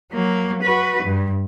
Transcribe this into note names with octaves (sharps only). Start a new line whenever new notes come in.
F#3 A#3
F#4 B4
G2